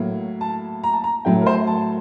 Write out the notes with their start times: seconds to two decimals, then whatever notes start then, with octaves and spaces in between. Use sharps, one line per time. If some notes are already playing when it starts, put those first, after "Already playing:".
Already playing: A2 F#3 A#3
0.41 A5
0.84 A#5
0.93 A5
1.04 A#5
1.25 A2 F#3 A3 G5
1.41 A#4
1.46 C5
1.67 A5